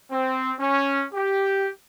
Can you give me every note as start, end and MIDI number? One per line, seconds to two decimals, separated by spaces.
0.11 0.53 60
0.59 1.04 61
1.14 1.69 67